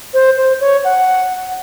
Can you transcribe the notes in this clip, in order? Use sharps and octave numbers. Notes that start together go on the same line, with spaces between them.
C5
C5
C#5
F#5